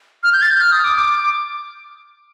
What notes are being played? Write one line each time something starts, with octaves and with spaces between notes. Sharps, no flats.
F6
G6
A6
G6
F6
D#6
D6
D6